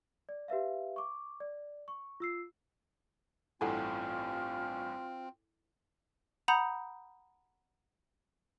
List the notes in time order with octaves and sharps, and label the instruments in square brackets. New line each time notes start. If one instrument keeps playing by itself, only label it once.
[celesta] D5
G4 B4 E5 F5
C#6 D6
D5
C#6
F4 E6 C7
[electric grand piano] A1 G2 G#5 [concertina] C4 [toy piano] E4 A4 F#5 [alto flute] F4
[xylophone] F#5 A#5 B5 D#6 G6